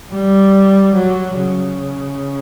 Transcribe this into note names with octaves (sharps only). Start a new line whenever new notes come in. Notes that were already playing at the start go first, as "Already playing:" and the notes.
G3
F#3
C#3